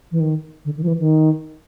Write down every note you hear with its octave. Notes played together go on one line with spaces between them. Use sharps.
E3
D#3
D3
D#3
F3
E3
D#3